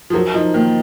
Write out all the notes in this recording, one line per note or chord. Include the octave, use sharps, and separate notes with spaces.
F3
F#3 A#4
F3 D#4
D#3 A#3